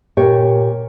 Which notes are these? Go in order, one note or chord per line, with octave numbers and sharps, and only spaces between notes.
A#2 G4 C#5